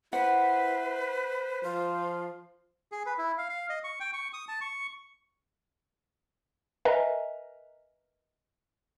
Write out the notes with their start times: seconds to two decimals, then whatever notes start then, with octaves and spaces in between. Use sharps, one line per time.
0.13 E4 B4 C5 F#5
1.63 F3 F4
2.92 G#4
3.06 B4
3.18 E4
3.38 F5
3.49 F5
3.70 D#5
3.84 C#6
4.00 G5
4.13 C#6
4.33 D#6
4.49 A5
4.61 C#6
6.85 A#4 B4 D#5 E5 G#5 A#5